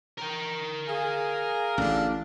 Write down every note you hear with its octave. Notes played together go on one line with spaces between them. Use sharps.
A#4 G5
G#4 F5 G#5
A1 D3 D4 F5